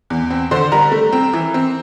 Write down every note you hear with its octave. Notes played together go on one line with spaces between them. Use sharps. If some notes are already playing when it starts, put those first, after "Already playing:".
E2
C4
D3 C5 C6
G3 A#4 A#5
A3
C4
E3
C4